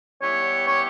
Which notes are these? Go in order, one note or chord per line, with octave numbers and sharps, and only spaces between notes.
E3 G3 B3 G4 C#5
C#5